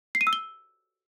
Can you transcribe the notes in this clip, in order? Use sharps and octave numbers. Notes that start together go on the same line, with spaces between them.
C7
D#7
E6
G7